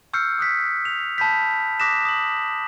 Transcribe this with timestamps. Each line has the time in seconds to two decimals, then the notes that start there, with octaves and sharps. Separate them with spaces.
0.13 C#6 E6 F6 G6 C7 C#7
0.39 D#6 F#6 B6
0.85 F7
1.18 A5 B5 G6 B6
1.80 D6 D#6 F#6 A#6 B6 E7
2.05 D#6 F#7